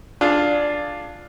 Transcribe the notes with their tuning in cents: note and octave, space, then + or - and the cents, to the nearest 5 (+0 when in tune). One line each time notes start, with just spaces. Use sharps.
D4 +0 F4 +0 G#4 +25